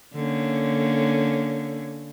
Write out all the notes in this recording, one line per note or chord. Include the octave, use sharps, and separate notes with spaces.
D3 A#3 C#4